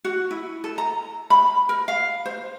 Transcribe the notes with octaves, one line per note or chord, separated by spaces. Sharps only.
F#4
E4
A4
A#5
B5
A#4
F5
C5